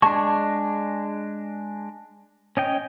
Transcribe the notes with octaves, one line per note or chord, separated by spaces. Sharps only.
G#3 D4 A5 C#6
C#4 D#5 G5